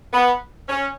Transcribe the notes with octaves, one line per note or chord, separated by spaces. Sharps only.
B3
C#4